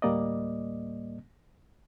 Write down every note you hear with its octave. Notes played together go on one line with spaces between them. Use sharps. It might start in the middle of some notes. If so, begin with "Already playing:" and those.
D2 A2 G3 A#3 D5 D#5